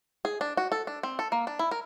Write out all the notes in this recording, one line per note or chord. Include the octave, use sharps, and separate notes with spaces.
G#4
D4
F#4
A4
D4
C4
A4
A#3
D4
E4
A#4